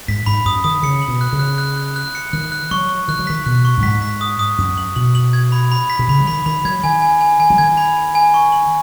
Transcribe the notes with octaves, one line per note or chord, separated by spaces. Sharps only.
G#2 B6
G#2 B5
F#2 D#6
D#3 D#6
C#3 C#7
F#7
B2
F#6
C#3
F#6
F#6
F#6
F#6
C#7
D#3 F#6
F#6
F#3 C#6
C#6
D#3 F#6
F#3
D#3 B6
B2 F#6
C#6
F#2
G#2 B6
B6
D#6
D#6
F#2 D#6
F#7
B2 F#7
F#7
G#6
B5
B5
B6
B2
C#3 B5
F#3
D#3 B5
D#3 B5
F#3 G#6
D#3 G#5
G#5
G#5
G#5
F#3
D#3 G#6
B5
G#5
G#5
C#6
F#7